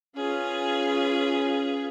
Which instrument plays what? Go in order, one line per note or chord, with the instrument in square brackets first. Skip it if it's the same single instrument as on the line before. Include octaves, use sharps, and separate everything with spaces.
[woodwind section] C#4 [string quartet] F4 G#4 B4